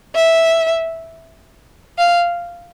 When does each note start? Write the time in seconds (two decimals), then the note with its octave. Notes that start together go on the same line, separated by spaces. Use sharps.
0.15 E5
1.99 F5